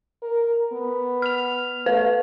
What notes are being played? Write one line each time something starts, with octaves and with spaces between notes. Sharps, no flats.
A#4
B3
F6 F7
A3 B4